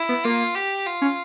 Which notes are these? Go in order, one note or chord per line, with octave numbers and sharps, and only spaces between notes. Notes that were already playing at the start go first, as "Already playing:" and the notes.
Already playing: E4
B3
A#3 F4
G4
F4
C#4